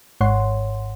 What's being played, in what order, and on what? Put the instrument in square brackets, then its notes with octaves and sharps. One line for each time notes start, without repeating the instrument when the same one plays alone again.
[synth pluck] G#1 G#2 C#5 F#5 C6